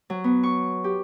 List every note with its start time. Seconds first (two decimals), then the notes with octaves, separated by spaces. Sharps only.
0.10 F#3
0.24 B3
0.43 C#6
0.84 G4